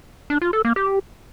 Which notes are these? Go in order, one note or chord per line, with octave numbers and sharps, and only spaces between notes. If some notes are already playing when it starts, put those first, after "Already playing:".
D4
F4
A4
A#3
G4